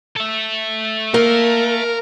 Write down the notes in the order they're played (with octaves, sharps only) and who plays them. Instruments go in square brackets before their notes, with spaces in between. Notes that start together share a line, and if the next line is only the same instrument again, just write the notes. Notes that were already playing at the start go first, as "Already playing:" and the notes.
[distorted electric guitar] A4 E5
[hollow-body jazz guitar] A#3 [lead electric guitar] A#4